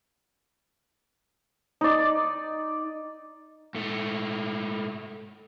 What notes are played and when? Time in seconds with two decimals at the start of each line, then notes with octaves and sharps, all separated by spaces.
1.81 D#4 D5
3.75 G#2 A3